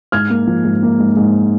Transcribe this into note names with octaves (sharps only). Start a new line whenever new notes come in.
G#2 F6 G#6
A#3
F3
G#2
A#3
G#2
G#2